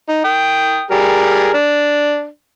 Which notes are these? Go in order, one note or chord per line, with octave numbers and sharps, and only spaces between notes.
D#4
G5 D#6
G3 G#4 A#4
D4